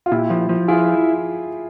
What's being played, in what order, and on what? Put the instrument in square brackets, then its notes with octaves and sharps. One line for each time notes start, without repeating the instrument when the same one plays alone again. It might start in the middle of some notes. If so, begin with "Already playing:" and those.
[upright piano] F4
[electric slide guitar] A#2 [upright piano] E4 G4
[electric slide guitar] F3
F3
[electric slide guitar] E4 [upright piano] F4 G#4